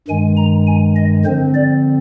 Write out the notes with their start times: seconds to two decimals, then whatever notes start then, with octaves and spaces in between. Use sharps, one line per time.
0.08 G2 D#3 G#3 G#5
0.37 A#5
0.67 G#5
0.96 D#5
1.25 D3 F3 C4 C5
1.54 D5